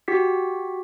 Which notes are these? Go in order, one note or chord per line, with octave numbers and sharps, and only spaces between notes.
F#4 G4 B6